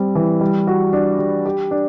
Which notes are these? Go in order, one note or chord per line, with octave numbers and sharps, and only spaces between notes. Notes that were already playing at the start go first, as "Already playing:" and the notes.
Already playing: G3 C4
E3
G3
F#4
D4
G3
G4
D4